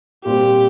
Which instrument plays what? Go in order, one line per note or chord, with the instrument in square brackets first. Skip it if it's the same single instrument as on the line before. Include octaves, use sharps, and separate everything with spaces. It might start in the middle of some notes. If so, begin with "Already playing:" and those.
[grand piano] A#2 G3 C4 [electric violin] G4